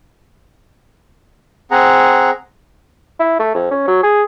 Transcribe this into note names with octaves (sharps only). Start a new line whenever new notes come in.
C4 G#4 F#5 A#5
E4
A3
F2
C#4
F#3
G#4